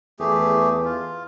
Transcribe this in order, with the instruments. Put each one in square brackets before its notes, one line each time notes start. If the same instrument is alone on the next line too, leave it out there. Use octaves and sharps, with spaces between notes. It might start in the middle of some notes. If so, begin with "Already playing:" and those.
[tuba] E2 [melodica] A3 G4 G#4
[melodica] F4